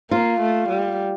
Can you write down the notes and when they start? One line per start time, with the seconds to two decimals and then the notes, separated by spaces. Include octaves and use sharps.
0.11 A#3 F4
0.40 A3
0.69 G3